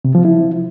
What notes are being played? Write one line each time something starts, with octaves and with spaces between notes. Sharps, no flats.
C3
F3
E4